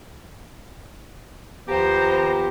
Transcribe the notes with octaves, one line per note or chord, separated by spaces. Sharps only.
D#2 F3 B3 G4 C5 A#5